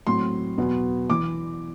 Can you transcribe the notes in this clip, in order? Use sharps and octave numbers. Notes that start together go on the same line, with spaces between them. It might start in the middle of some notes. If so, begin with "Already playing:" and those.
A2 F#3 C4 C6
E2 B2 F#3 B3
E3 D6